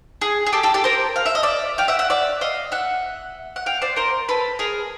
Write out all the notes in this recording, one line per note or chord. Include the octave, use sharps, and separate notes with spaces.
G#4
G#4
G4 A4
G4 A4
G4 A4
A#4 C5
F5
E5
D#5
D5 E5
F5 G5
E5 F#5
E5 F#5
D5 E5
D#5 F5
E5 F#5
F#5
F5 G5
C5 D5
A#4 C5
A4 B4
G#4 A#4